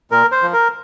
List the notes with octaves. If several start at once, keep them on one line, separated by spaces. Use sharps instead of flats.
A#2 A#4
C5
F3
A#4